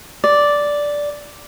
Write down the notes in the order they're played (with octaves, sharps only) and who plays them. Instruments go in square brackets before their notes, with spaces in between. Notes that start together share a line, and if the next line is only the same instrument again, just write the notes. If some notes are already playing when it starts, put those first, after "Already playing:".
[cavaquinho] D5